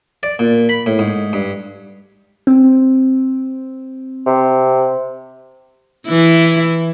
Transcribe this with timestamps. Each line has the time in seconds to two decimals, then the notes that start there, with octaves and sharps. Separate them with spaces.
0.23 D5
0.39 A#2
0.69 B5
0.86 A2
0.99 G#2
1.33 G2
2.47 C4
4.26 C3
6.07 E3 E4